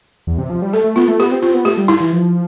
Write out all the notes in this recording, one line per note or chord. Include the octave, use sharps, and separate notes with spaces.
E2
C3
F3
G3
A3 A4
A3
B3 F4
A3
B3 G4
C4
C4 F4
B3
A3 G4
G3
E4
E3
F3